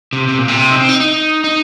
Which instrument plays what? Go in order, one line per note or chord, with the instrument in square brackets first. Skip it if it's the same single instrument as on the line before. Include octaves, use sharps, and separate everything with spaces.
[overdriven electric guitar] C3
C3
A#2
C3
D#4
C4
D#4
D#4
D#4